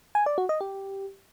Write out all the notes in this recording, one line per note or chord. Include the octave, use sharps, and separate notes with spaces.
G#5
D5
F#4
D#5
G4